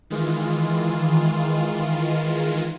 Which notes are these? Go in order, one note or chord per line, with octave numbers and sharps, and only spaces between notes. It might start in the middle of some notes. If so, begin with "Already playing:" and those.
D#3 E3 G#3 F4